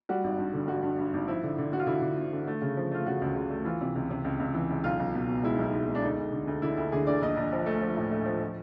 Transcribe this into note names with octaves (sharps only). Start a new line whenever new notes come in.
G3 F#4
G#1
G2
D3
G3 F#4
G2
G2
G#1
F3 E4
D3
D3
D3 F#4
F4
D3 E4
D3
D3
D3
A3
C#3
F3
A3 F4
C#3 F#4
C#2
C#2
A3
E3 F4
C3
C#2
C3
C#2
C#2
E3
C#2
B1 F4
B1
B2
B2
G#3 E4
D#4
B1 E4
B2
G#3
D4
D2 D#4
D2
D3
D2
D3 E4
D2 E4
D3 G#4
D2 D5
A#1 D#5
A#1
F3
A3
F3
A2
A3
F3
F3